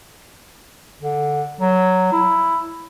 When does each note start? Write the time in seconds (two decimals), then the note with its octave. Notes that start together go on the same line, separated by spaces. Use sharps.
1.02 D3
1.61 F#3
2.13 E4